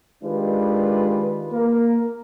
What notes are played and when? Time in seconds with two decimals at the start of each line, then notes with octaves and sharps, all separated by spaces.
0.23 D#3 G#3 D4 F4 G4 B4
1.52 A#3 A#4